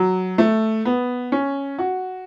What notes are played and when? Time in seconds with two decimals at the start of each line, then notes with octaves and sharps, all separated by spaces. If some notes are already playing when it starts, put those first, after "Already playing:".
Already playing: F#3
0.38 A3
0.85 B3
1.32 C#4
1.79 F#4